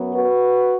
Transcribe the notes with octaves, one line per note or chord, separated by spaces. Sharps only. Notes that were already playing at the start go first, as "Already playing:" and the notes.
Already playing: F#2 F#3 B3
F#4 B4